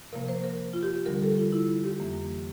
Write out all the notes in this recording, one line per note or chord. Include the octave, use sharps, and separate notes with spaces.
C3 F3 A#3 A#4
C5
A#4
F4
G4
D2 D3 G3 A#4
A4
F4
E4
G4
F2 E3 A#3